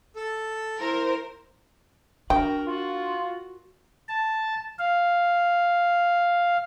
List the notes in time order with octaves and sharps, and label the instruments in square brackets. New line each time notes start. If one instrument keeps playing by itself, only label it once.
[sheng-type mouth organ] A4
[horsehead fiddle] E4 C5 [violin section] A#4
[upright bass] D4 [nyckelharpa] F#4 A#4 [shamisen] G5
[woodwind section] F4 [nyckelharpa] F#4
[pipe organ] A5
F5